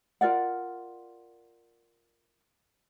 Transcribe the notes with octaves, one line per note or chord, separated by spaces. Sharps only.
F4 A#4 D5 F#5